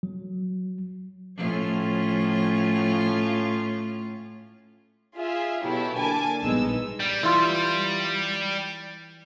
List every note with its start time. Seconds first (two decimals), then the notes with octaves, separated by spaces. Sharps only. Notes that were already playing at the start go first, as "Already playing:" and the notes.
0.03 F#3
1.37 A2 F3 C#4 F4
5.15 F4 G#4 E5
5.63 B2 F#3 E4 G4 A4
5.97 D3 A#3 G#5 A5 D6
6.42 A#1 G2 G#3 B3 D#4 E6
7.00 G3
7.23 E3 F4